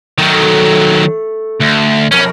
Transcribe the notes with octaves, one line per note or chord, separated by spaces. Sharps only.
D#3 F#3 A3
D2
F2 B2 C#4 A#4